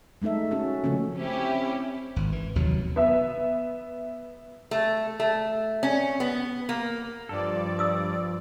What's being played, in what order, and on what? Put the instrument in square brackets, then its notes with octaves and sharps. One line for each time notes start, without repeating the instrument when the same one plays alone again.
[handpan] G#3 A3 D#4 A4 E5
C#4 F#4 A4
C#3 F3 A3 A#3 C#4
[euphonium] C4 [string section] C#4 E4 G4
[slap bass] G#1
E3
F1 D#2 B2 F#3
[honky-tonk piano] B3 E5
[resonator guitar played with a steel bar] A3
A3
C#4
B3
A#3
[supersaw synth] G2 D5 [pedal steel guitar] F3 A4
[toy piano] D#6 E6